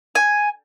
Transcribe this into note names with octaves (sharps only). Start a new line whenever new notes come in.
G#5